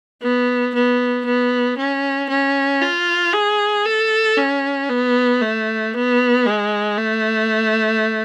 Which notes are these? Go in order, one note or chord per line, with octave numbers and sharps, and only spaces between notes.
B3
B3
B3
C#4
C#4
F4
G#4
A4
C#4
B3
A3
B3
G#3
A3